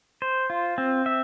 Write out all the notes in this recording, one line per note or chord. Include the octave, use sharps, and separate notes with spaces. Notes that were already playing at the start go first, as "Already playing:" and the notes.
C5
F4
C4
E5